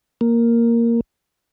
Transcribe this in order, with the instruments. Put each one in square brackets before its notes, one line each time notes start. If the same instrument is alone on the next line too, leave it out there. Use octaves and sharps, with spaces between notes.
[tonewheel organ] A#3